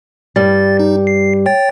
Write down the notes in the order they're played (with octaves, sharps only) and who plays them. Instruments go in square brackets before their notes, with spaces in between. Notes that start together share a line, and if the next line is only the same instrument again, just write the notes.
[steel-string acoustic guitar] G2 G3 [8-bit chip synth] A6
[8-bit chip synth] D#4
C7
C#5 G5 A6